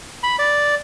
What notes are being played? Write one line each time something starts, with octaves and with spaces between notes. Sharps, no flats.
B5
D5